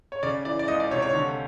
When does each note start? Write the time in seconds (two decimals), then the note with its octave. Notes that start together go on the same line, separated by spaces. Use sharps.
0.12 C#5
0.23 C#3 D5
0.45 E3 D5
0.59 D5
0.68 C#2 D#5
0.80 D5
0.91 C3 C#5
1.02 C#5
1.13 D3